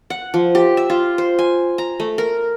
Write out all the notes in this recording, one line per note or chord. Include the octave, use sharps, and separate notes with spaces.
F#5
F3
G4
E5
F4
C5
G#5
A#5
A3
A#4